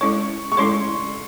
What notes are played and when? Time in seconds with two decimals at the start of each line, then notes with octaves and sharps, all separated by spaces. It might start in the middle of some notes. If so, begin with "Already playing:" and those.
0.01 G#3 C#4 E4 A4 C#5 C#6
0.52 C#6
0.57 G#3 C#4 E4 A4 C#5 C6